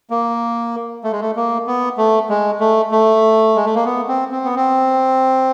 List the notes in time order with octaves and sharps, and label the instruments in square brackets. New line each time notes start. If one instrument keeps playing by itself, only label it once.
[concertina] A#3
A3
G#3
A3
A#3
B3
A3
G#3
A3
A3
G#3
A3
A#3
B3
C4
C4
B3
C4